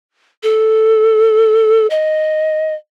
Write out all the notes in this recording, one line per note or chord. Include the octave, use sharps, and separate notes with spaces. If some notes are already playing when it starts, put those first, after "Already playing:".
A4
D#5